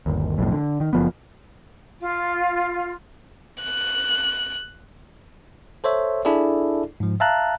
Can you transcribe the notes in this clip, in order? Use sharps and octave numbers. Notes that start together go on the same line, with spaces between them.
G1 D#2
B1 F2 A2
D3
D#3
F#1 F3 B3
F4
F#6
A4 C5 C#5 E5
D4 E4 G#4 A4 D5
G#2 F3
E5 F5 A5 A#5 F#6